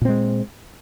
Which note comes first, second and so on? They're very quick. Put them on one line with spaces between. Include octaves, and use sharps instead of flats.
A#2 C4 G#3